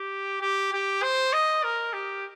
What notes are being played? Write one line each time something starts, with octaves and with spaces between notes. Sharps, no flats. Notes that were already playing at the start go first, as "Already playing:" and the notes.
Already playing: G4
G4
G4
C5
D#5
A#4
G4